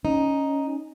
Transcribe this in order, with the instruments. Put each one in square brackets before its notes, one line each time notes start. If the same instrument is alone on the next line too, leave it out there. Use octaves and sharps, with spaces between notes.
[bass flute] C#4 [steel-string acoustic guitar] D#4